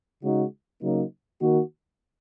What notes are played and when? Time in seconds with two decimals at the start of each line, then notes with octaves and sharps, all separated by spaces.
0.23 C#3 G#3 D#4 F#4
0.82 C#3 F#3 A#3 D#4
1.40 D#3 A#3 F#4